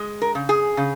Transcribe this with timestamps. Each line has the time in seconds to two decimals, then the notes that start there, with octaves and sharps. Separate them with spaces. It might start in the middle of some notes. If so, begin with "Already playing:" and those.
Already playing: G#3
0.22 A#4
0.35 C#3
0.49 G#4
0.77 C#3